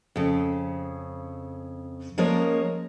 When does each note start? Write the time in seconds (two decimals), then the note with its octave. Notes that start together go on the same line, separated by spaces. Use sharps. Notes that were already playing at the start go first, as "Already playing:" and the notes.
0.16 F2 C#3
2.18 F3 G#3 A#3 C#4 A#4 C#5